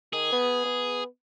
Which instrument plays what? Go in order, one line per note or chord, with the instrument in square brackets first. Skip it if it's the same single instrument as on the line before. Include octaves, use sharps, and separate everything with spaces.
[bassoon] D#3 [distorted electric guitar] G#4
[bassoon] B3
B3